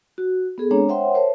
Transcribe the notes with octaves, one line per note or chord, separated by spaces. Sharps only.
F#4
B3 G#4 A4
G#3 C4 D4 C#5 A#5
C5 C#5 E5 F#5 G5 C6
A#4 C5 C#5 E5 A5